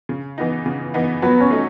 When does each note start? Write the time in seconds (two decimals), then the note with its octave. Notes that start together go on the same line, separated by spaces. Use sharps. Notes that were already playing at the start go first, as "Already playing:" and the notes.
0.09 C#3
0.38 E3 B3 D#4
0.66 C#3
0.94 E3 B3 D#4
1.22 F#3 B3
1.40 C#4
1.51 A3 D#4